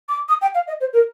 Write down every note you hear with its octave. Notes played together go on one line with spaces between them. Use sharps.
D6
D#6
G5
F5
D#5
C5
A#4